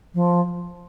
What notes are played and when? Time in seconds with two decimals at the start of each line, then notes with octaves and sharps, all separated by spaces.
0.14 F3